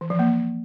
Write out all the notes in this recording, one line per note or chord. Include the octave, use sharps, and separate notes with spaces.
E3
F3
A#3